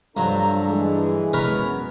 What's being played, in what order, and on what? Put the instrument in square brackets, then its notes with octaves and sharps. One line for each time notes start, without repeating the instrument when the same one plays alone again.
[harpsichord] G2 F#3 [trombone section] D4 A4 [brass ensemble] F4 C5 A#5
[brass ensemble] E3 G#3
[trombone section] F#2 B3 [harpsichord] A#4 B4 C#5